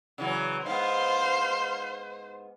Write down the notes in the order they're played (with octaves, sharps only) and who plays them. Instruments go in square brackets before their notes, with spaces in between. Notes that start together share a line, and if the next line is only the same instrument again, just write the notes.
[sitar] C#3 E3 F#3
[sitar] G#2 B3 [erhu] C5 [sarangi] F5